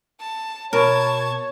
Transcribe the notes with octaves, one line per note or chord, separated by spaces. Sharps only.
A5
B2 A#4 C#5 A5 G#6